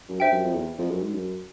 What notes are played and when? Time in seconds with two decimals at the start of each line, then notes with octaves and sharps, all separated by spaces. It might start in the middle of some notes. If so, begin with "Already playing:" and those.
0.09 F#2
0.20 G2 C5 E5 G5
0.32 F#2
0.44 F2
0.55 E2
0.78 F2
0.90 F#2
1.02 G#2
1.14 F#2